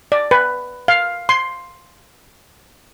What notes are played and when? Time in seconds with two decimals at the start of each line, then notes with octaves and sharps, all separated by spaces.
0.12 D5
0.31 B4
0.88 F5
1.29 C6